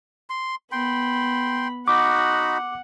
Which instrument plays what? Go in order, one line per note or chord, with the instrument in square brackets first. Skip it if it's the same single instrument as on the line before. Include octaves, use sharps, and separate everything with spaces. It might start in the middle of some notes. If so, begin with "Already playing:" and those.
[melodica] C6
[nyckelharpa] B3 B5 [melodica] G5 C6
[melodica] D#4 F#4 B5 [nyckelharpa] F#5 [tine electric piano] D6